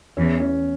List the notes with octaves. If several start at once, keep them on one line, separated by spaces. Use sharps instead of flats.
E2 C#4
C#4